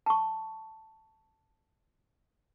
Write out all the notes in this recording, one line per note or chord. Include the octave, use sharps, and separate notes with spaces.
A5 C#6